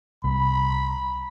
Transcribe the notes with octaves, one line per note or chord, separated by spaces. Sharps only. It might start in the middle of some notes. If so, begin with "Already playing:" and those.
C2 B5